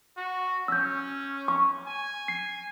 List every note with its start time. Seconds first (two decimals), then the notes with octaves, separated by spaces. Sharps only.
0.17 F#4
0.68 C#4 E6 G6
1.48 C#6
1.87 G#5
2.28 C7